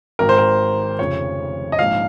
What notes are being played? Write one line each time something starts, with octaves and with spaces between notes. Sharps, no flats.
G#1 G#2 D#3 A#4
C5
A#4
F1 F2 C#3 F3 C#5
D#5
A#1 G#2 F3 F5